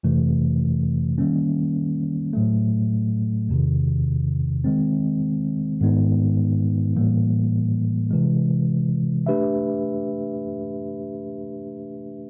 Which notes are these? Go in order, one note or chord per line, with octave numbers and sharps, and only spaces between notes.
F2 C3 E3 A3
D#3 G3 A#3 C#4
A2 F#3 A3
E2 C3 D#3
D#3 G#3 C4
G#2 D#3 G#3 B3 D#4
A2 E3 G3 A#3
C3 E3 G#3
A3 D4 G4 B4 E5